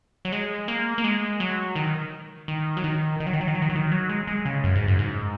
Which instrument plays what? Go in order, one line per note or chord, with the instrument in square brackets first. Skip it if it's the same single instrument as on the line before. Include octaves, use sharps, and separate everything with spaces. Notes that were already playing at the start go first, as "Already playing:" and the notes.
[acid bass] F#3
G#3
A#3
A#3
G#3
F#3
D#3
D#3
F#3
D#3
D#3
F#3
D#3
F#3
D#3
F#3
D#3
F#3
D#3
F#3
G#3
G#3
C#3
F#2
G#2
F#2
G#2